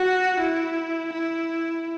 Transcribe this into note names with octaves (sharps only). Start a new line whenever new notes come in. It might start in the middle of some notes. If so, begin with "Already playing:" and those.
Already playing: F#4
E4
E4